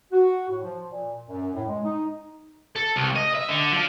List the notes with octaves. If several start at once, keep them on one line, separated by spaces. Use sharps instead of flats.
F#4
A2
F3
A#2
F#2
A2
G#3
D#4
A4
C2
D#5
E5
D3
F3